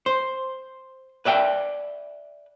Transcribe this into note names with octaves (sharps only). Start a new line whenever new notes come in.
C5
B4 D5 E5 G5